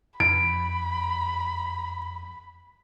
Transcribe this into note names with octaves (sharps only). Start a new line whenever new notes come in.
F2 B5 D7